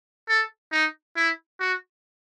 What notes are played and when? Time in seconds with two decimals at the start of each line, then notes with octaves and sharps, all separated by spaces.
0.28 A4
0.72 D#4
1.16 E4
1.60 F#4